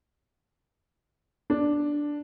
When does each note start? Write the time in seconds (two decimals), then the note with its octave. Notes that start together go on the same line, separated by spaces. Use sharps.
1.50 D4